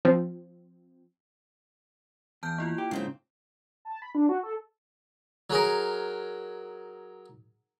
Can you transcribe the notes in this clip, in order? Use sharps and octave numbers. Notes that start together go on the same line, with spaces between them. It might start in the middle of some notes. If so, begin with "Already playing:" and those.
F3 C4
E2 A5 F6 G6
A#3 E4 F4
G4
G#2 C#3 C4 C5
A5
B5
D4
F#4
A4
F#3 G#4 A#4